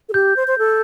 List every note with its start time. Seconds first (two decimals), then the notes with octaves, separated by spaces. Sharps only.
0.09 A4
0.14 G4 G6
0.36 C5
0.47 C5
0.59 A4